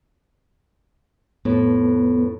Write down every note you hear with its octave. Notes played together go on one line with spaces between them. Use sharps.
F2 A2 B3